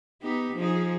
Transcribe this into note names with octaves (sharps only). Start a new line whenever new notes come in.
B3 D#4 G4
F3 D#4 G#4